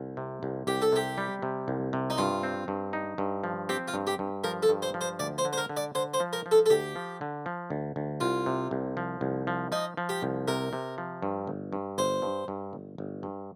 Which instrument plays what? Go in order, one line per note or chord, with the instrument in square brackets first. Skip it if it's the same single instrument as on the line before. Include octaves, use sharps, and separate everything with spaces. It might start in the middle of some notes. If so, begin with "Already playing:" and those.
Already playing: [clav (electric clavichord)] C2
C3
C2
[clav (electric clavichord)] C2 [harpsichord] G4
[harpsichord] A4
[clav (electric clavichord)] C3 [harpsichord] G4
[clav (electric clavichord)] G3
C3
C2
C3
[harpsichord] D#4
[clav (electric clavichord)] G2 [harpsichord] F4
[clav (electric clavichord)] C4
G2
D#4
G2
F3
[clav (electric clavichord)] C4 [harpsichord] G4
[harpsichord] F4
[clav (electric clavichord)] G2
[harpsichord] G4
[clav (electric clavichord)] G2
[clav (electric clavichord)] F3 [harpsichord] A#4
[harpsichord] A4
[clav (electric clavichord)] G2
[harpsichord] C5
[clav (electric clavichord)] F3
[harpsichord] C5
[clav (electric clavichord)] D2 [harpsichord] D5
[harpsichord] C5
[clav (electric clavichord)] D3
[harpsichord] C5
A#4
[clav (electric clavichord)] D3
[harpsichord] D5
[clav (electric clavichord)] D3 [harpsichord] C5
[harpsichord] C5
[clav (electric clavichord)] F3
[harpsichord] A#4
[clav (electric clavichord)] F3
[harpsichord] A4
A4
[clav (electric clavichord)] D2 [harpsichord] G4
[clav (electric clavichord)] F3
D3
F3
D2
D2
[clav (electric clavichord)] C2 [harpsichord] F4
[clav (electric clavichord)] C3
C2
F3
C2
F3
[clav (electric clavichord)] F3 [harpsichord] D#4
[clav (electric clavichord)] F3
[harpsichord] G4
[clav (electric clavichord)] C2
[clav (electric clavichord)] C3 [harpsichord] A#4
[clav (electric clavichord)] C3
F3
G2
G1
G2
[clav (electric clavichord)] G1 [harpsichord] C5
[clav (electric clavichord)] G2
G2
G1
G1
G2